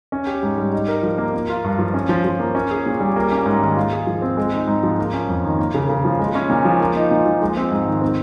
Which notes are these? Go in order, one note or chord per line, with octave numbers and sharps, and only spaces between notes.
C#4
G4
G#2
G3
D#4
A#4
F3
A#3
A#3
F4
G2
F3
C#4
F3
F3
A#3
C#4
G#4
A#2
G3
A#3
C#4
G#2
D#3
F4
G#4
F3
C4
G#3
D#4
G#2
F3
A#3
C#4
F2
D#3
A#3
C#3
C#3
F3
G#3
C#4
A#2
F3
A#3
D#4
A#2
F3
G#3
C4
G#2
D#3
C4